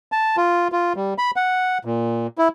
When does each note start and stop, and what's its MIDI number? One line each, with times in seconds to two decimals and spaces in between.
0.12 0.36 81
0.37 0.68 65
0.72 0.93 65
0.96 1.14 55
1.18 1.31 83
1.36 1.78 78
1.85 2.27 46
2.38 2.48 64